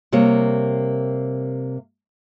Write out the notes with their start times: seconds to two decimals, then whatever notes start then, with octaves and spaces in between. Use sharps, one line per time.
0.12 C3 G3 A#3 A#4 C#5